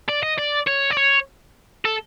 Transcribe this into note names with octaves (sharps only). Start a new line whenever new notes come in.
D5
D#5
D5
C#5
D5
C#5
A4